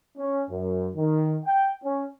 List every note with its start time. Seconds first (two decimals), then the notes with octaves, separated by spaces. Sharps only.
0.17 C#4
0.49 F#2
0.95 D#3
1.45 G5
1.83 C#4